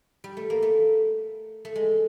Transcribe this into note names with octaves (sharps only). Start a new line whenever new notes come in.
G3
A3
A#3
A3
A3
G#3